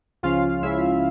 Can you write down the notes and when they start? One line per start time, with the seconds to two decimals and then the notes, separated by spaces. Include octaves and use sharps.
0.23 C#2 C#3 F3 C#4 F4 F5
0.62 C#2 C#3 F3 C#4 E4 E5